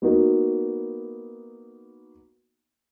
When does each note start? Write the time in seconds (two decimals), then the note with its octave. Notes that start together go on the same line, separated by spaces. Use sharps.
0.02 A#3 B3 D#4 F#4